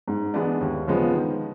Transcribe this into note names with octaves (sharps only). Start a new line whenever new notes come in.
G#2
E3 G#3 B3 D4
D#2
C#3 F3 G#3 B3
D#3